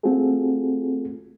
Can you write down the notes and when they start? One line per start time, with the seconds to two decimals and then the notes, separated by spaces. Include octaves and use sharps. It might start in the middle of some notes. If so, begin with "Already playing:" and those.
0.03 A3 C4 F4 F#4 G#4 A4